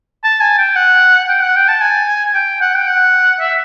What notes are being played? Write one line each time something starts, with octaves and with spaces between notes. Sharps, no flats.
A5
G#5
G5
F#5
G5
F#5
G5
A5
G#5
G5
F#5
G5
F#5
E5